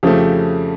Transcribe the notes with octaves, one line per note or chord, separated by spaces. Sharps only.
F2 C#3 F3 A3 G4